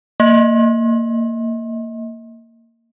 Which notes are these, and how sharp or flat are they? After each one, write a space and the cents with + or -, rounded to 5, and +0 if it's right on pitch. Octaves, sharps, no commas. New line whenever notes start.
A#3 -20 D#5 +40